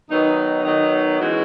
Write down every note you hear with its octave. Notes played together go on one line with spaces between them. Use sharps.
D#3 F#3 B3 D#4
D#3 F#3 B3 D#4
E3 G#3 C#4 F#4